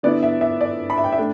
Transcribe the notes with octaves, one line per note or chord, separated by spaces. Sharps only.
D3 B3 E4 D5
E5
E5
D5
B5
E5
G5
E5
A3 D4